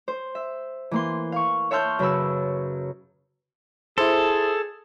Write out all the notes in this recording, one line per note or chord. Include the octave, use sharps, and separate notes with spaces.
C5
E5
E3 A#3 C6
F5 C#6
C#5 E5 A5 C6 F6 G6
F#2 C#3 B4 B5 E6
E4 G#4 A4 C5